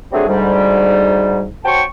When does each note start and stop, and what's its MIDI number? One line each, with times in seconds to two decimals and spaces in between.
0.12 0.27 54
0.12 0.27 55
0.12 0.27 57
0.12 0.27 60
0.12 0.27 62
0.12 0.27 68
0.27 1.46 38
0.27 1.46 44
0.27 1.46 55
1.65 1.83 66
1.65 1.83 72
1.65 1.83 73
1.65 1.83 79
1.65 1.83 81
1.65 1.83 85